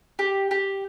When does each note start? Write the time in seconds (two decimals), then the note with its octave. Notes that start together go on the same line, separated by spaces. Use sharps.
0.19 G4
0.51 G4